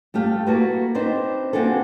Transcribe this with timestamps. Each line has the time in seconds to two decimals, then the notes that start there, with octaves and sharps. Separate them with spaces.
0.14 G2 A3 G4 F5
0.47 A#3 E4 F#4 A4 B4
0.95 C4 D4 D#4 B4 C5
1.53 A#3 C4 D4 F#4 G#4 A4